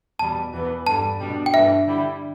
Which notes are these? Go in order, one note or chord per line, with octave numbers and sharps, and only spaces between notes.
E2 B2 G3 A5
E2 E3 B3
G2 D3 G3 A5
B2 G3 D4
G5
G2 E3 A3 D4 E5
D3 G3 E4